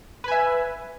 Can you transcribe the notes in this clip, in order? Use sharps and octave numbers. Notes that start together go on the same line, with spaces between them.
B4 E5 G#5